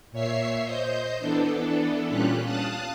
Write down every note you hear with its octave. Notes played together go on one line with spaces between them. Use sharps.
A#2 C#5 E5 C7
C5 D#5 G6
E3 B3 D4 A4
A#2 G3 C#4 F4 G4 F#6
F5 A5 D#6 F#6